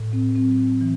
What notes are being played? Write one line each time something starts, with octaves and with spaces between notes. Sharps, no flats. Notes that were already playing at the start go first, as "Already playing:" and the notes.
Already playing: A2
C4
F#3 C4
E3